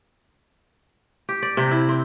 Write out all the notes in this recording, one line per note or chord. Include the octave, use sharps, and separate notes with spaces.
G4
D5
C3
E4
C4